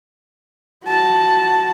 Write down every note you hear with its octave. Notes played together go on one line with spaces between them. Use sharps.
F#4 A5